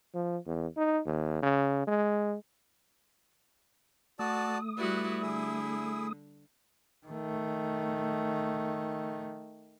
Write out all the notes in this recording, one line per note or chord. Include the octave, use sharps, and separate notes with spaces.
F3
E2
D#4
D#2
C#3
G#3
A3 F#4 D5 A5 D#6
G3 E4 F#4 B4 D5
D3 E4 G#4 E5
D#3 A3